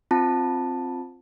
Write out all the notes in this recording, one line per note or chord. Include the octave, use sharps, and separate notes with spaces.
C4 F4 A5